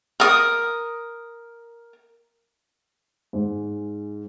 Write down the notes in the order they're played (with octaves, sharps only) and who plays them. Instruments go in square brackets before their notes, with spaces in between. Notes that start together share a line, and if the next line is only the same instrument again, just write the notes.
[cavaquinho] A#4 D#6
[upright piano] G#2